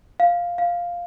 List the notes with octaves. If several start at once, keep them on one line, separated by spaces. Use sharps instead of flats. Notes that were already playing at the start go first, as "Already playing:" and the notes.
F5
F5